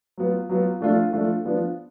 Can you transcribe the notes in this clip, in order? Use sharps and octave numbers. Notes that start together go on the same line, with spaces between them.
F#3 B3 F4
F#3 B3 F4
F3 A3 D4 F4
F3 A3 D4 F4
F3 B3 D4 F4